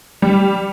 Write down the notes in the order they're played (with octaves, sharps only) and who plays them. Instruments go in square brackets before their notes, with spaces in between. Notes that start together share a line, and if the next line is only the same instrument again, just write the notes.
[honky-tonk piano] G3